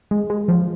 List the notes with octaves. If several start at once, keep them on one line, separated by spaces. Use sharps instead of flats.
G#3
G#3
F3